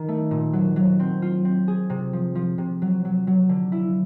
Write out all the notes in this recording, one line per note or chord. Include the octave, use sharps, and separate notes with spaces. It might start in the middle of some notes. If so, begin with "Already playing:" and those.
Already playing: D#3
A3
A#2
F#3
F#3
C4
F4
C4
G#4
C3
F3
F3
C3
F#3
F#3
F#3
D3
E4